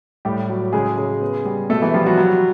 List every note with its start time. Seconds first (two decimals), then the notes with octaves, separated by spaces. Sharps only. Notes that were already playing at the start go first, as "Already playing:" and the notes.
0.25 A2 G3 G4
0.50 F#3
0.73 C#3 G#3 G#4
0.98 C#3
1.22 B3
1.45 G3
1.70 B2 A3 A4
1.82 E3 E4
1.94 F3 G3 F4
2.06 F#3 F#4
2.17 F#3 F#4